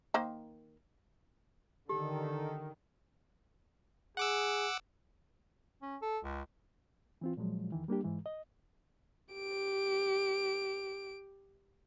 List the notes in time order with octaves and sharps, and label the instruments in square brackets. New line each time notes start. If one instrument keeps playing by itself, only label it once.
[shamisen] D#3 A#3 C5
[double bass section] D3 [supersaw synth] D#3 [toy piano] G4 [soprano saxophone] A4
[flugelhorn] G#4 [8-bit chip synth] F#5 D6 E6
[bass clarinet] C#4
A4
C#2
[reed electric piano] E3 C4 F4
A#2 F3 F#3 G#3
E2 D#3 E3
G3 A#3 D4 G4
G#2 E3 G#3
D#5
[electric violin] G4 D7